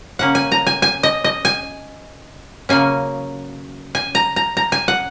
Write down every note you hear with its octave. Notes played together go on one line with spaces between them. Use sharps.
C#3 A#3 C#4 F#5
G#5
A#5
G#5
G#5
D#5
D#5
G#5
C#3 F#3 A#3 C#4 G#5
G#5
A#5
A#5
A#5
G#5
F#5